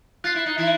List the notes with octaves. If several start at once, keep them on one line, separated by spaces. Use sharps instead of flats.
F4 F#6 A6 C7
E4
D#4
E3 E4